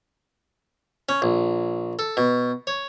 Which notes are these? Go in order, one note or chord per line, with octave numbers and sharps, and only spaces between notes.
C#4
A#1
A4
B2
C#5